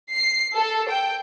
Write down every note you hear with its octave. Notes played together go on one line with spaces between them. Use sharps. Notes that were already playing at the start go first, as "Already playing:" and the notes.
C7
A4
G5